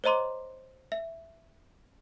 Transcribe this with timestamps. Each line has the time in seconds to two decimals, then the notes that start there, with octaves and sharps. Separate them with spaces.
0.04 C5 C#5 D#5 A#5 C6 D6
0.92 E5